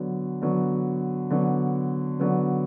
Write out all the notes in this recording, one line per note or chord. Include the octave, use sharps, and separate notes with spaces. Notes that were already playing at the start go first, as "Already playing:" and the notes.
Already playing: D3 F#3 B3
D3 F#3 B3
D3 F#3 B3
D3 F#3 B3